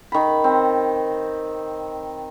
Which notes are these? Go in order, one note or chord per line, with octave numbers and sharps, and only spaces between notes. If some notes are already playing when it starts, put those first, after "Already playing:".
D#3 B5
C4